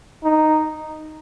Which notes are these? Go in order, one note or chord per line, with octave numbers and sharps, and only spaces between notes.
D#4